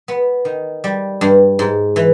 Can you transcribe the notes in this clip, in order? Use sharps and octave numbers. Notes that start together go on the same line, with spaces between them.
B3
D#3
G3
G2
G#2
E3